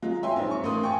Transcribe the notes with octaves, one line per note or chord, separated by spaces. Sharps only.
F#3 G#3 F4
C#5 E5 G5 G#5 C6
A#1 C4 D#4
C#6
A1 A#3 C6 D#6
G5 G#5 C#6